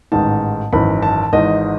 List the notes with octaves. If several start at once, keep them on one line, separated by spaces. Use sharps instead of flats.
A1 G#2 D#3 A5
G#1 F#2 E3 B5
A5
G#1 G#2 E3 D#5